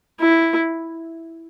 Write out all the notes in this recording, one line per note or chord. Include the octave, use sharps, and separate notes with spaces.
E4